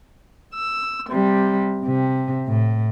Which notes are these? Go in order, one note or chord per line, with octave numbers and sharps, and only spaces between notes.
E6
C3 G3
C3
A2